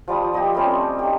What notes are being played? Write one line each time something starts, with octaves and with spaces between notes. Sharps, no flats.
F3 G3 A5 D#6
G4 D5 D#5
G3 A3 C4 C#4
D#4 G4